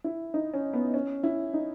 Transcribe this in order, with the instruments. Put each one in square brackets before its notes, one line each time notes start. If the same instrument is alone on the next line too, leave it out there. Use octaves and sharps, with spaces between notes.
[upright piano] E4
D#4
C#4
B3
C#4
E4
D#4